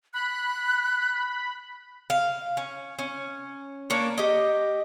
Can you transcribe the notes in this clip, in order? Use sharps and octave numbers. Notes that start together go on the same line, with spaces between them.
B5 F#6
F5
C#4
C#4
A#3 D4 C#5
G4 D#5